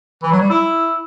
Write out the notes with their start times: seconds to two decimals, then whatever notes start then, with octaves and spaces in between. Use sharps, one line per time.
0.23 E3
0.32 F#3
0.41 G3
0.50 E4